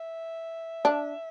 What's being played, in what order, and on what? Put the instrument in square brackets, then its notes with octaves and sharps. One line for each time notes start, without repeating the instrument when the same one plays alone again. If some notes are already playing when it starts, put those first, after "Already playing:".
Already playing: [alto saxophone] E5
[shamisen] D4